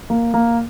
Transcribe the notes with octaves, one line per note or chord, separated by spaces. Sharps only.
A#3
A#3